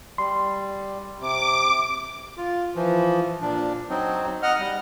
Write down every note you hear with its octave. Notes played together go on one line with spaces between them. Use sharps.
G3 C6
C3 D6
F4
E3 F3
A#2 D4
F#3 C4 D#4
D#5 F#5 F6
G3